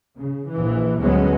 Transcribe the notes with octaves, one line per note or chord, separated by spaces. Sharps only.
C#3
A#1 E3
D2 F#3 G#3 B3 C#4